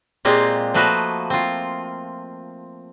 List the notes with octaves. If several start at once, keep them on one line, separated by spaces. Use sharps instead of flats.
A#2 G#3 A#3 C4 F4 G4
F3 A3 A#3 F#4 B4 D#5
C4 F4